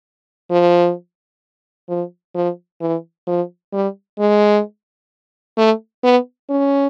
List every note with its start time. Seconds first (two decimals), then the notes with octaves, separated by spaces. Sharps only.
0.51 F3
1.89 F3
2.35 F3
2.81 E3
3.27 F3
3.73 G3
4.19 G#3
5.58 A3
6.03 B3
6.50 C#4